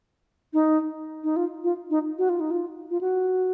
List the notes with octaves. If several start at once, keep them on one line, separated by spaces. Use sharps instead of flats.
D#4
D#4
F4
F4
D#4
F#4
F4
D#4
F4
F4
F#4